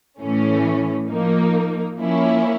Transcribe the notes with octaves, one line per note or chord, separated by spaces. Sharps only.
A2 E3 A3 C#4
F3 A#3 D#4
F3 A#3 C#4 E4